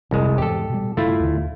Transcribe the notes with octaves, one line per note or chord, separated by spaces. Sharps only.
F1 C2 G#3
E2 G#2 G4 A4
B2 G3
G2 C#3 G3 A3 E4 F4
D#2 D3